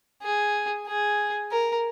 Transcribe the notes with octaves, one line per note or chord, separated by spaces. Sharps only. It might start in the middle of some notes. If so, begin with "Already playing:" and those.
G#4
G#4
A#4